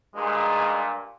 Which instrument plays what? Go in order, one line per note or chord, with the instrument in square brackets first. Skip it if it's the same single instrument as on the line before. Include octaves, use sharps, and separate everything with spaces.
[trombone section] G2 A#2 [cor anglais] G#3